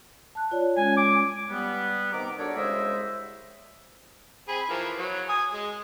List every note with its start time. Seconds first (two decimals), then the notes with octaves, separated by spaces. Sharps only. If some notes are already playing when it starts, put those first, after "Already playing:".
0.35 A5 F#6
0.51 F4 C#5 D5
0.77 G#3 C#4 G#5
0.97 D6
1.50 G3 B3
2.12 C3 D#3 B3 A#5 D6
2.39 D4 F#4 A4 A#4 C#5 D5
2.56 C2 C#3 G#3 C5 D#5 E5
4.48 C4 G#4 B5
4.70 E3 F3 A#4
4.98 F#3 C#5
5.29 G#5 D#6
5.53 G#3